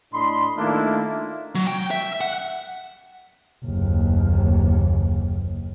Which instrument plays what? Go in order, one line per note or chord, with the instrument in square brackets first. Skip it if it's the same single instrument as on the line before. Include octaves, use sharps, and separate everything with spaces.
[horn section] A2 D4 D#5 B5 C6
D#3 A3 A#3 D4 E4 F4
[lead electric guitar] F#3
G5
E5
F#5
[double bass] F#1 D#2